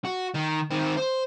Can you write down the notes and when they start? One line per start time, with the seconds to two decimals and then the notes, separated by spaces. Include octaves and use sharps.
0.05 F#4
0.34 D#3
0.71 D#3 C4
0.97 C5